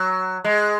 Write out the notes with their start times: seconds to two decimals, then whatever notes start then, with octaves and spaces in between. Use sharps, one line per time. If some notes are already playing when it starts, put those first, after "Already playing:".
Already playing: F#3
0.45 G#3